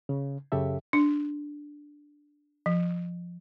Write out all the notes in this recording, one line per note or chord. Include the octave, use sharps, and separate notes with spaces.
C#3
F#2 C#3 G4 A4 E5
D4
F3